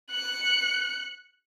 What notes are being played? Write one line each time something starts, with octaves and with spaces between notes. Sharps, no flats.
F#6 C#7